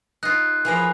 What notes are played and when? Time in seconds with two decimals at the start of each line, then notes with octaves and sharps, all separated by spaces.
0.23 D#4 F4 F#6
0.65 E3 F3 G#4 A#4 B5